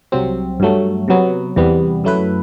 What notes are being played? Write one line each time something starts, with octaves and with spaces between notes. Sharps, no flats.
C2 C3 F#3 C4
G2 F#3 A3
C3 F#3 B3
E2 C3 G3 B3
F#2 F#3 A3 E4 B4